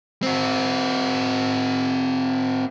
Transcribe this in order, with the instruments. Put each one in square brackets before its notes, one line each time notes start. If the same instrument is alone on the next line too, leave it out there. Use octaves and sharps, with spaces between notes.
[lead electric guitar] C4 F#4